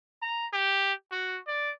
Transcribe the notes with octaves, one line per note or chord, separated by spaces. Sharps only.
A#5
G4
F#4
D5